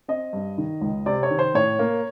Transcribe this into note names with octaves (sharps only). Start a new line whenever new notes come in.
C4 D#5
G2
D#3
C#2
C3 D5
C#5
D#3
C5
A2 C#5
A#3